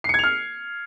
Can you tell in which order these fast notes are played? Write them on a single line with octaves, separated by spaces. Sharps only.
C7 C#7 G#6 F7 F6